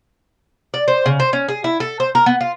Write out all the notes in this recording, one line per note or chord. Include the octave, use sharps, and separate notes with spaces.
D5
C5
C#3
C5
C#4
G#4
E4
A4
C5
A#4
B3
F4